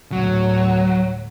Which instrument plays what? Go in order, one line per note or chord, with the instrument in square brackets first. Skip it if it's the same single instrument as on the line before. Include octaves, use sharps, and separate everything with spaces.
[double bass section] D2 A2 [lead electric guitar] F#3